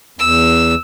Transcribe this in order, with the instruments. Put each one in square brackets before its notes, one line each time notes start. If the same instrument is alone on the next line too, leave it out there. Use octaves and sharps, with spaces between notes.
[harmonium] E2 [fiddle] E6